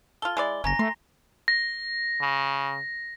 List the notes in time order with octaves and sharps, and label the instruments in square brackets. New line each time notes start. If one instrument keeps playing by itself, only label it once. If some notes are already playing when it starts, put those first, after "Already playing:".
[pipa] F4 A4 [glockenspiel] G7
[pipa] G#3 E4 D5
[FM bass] F#1 [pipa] C#4 [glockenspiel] G#5 A#5 A#6
[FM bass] A3 [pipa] C6
[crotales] A#6
[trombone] C#3